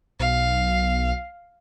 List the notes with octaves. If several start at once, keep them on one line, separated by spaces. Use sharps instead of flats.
B1 F5